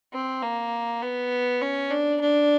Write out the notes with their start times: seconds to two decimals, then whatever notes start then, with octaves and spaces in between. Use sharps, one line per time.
0.13 C4
0.42 A#3
1.02 B3
1.61 C#4
1.91 D4
2.21 D4